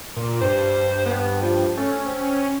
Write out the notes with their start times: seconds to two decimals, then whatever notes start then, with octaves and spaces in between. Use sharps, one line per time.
0.16 A#2
0.41 G2 C5
1.06 B3
1.41 F3
1.77 A3 C#4
2.05 C4